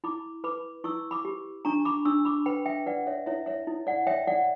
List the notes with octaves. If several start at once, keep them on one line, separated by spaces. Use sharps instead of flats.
E4 B5 D6
B4 B5 D6
E4 C#6 E6
B5 D6
G4
D4 A#5 C#6
B5 D6
D4 C#6 E6
B5 D6
B4 G5 B5
E5 G5
B4 D5 F#5
C#5 E5
E4 C#5 E5
C#5 E5
E4
D5 F#5
C#5 E5 G5
D5 F#5